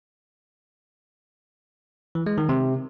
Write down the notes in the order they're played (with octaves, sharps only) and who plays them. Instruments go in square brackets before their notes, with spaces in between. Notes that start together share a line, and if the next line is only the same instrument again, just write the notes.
[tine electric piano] E3
G#3
D#3
C3